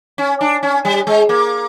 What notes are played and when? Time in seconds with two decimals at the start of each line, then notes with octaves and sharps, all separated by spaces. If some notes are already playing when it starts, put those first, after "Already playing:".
0.18 C#4
0.41 D4
0.63 C#4
0.85 G3
1.07 G#3
1.29 A#3